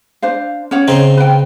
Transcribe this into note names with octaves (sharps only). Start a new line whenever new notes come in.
D4 C5 F5
C#4 C#5 F#5
C#3 C4 D#4
B4 G5